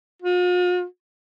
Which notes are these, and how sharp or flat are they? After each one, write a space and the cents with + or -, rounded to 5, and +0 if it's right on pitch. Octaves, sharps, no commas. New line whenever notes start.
F4 +45